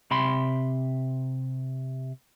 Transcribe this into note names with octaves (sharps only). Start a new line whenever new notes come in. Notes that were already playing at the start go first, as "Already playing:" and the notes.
C3 B5 C6